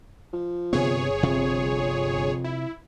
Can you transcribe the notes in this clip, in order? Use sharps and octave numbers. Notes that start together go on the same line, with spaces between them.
F3
G1 C3 B3 G#4 C#5
F2 C3
E4